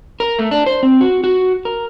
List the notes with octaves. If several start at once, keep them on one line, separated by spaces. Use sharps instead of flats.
A#4
A3
D4
C5
C4
F#4
F#4
A#4